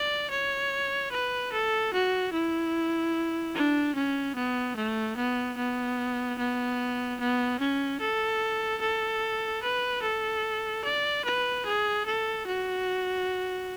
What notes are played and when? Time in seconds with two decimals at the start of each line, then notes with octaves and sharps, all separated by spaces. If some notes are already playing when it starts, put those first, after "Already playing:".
Already playing: D5
0.30 C#5
1.12 B4
1.52 A4
1.93 F#4
2.33 E4
3.55 D4
3.95 C#4
4.35 B3
4.76 A3
5.17 B3
5.57 B3
6.38 B3
7.20 B3
7.59 C#4
8.00 A4
8.81 A4
9.63 B4
10.02 A4
10.84 D5
11.25 B4
11.66 G#4
12.06 A4
12.46 F#4